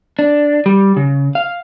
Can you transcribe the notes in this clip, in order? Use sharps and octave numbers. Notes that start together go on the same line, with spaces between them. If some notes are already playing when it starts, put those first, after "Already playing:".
D4
G3
C#3
F5